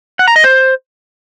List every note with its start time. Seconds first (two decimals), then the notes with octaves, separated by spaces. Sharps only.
0.19 F#5
0.28 A#5
0.36 D#5
0.44 C5